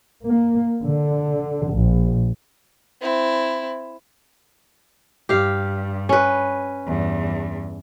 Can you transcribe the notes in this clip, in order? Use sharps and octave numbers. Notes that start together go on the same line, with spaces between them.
A#3
D3
A#1
C4 E4
G2 G4 F5
C#4 B4
E2 G2